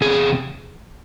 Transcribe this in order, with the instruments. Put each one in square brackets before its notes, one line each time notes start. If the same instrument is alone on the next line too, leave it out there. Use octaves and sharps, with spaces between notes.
[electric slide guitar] E2 C3 G#4